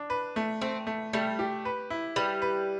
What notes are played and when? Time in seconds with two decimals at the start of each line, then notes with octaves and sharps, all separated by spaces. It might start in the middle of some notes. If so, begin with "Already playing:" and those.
Already playing: D4
0.10 B4
0.36 A3
0.62 A3 C4
0.87 A3
1.13 G3 A3
1.39 G4
1.65 B4
1.90 E4
2.16 G3 B4
2.42 B4